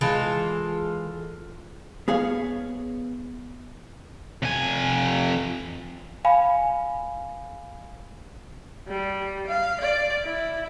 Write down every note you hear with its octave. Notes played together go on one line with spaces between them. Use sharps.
E3 G#3 F4 A4
B3 G#4 C#5 F5
F2 G#5
F5 G#5 B5
G3
F5
D5
E4